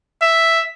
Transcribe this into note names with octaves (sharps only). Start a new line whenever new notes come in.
E5